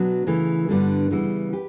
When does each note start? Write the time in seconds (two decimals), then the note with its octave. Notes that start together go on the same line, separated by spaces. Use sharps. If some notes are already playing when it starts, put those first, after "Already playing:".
Already playing: B2 F#3 B3 D4
0.27 C#3 E3 A3
0.69 G2 D3 G3 B3
1.11 C#3 E3 G3 B3 E4
1.53 G4 B4